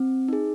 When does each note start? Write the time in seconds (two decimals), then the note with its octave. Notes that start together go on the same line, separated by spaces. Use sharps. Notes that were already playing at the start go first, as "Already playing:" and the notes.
Already playing: C4
0.28 D#4 G#4